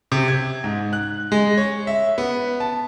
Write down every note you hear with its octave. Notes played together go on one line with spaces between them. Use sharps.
C3
G#6
G#2
F#6
G#3
C#5
E5
B3
A5